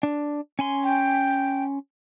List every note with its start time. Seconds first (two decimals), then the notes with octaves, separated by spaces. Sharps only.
0.03 D4
0.59 C#4 G#5 C6
0.84 G5